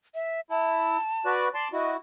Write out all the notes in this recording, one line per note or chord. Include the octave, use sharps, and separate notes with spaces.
E5
E4 A5
F#4 B4 D5
D5 A5 C6
E4 F#4 D#5